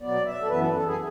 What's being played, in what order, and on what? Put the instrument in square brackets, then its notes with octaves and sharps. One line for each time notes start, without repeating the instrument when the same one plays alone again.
[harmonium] B2 F#3 B3 D5
E5
A4
F#2 E3 B3 B4
A4
A4
G#4